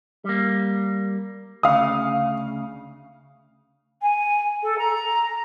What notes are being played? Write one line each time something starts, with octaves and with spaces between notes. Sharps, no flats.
G3 A#3
D2 C#3 F5 D#6
G#5
A4
A#5